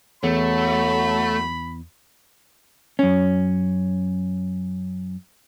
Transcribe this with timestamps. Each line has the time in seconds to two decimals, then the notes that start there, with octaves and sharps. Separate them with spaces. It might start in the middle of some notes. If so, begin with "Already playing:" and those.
0.23 E2 F#3 A3 B5
2.99 F#2 C#4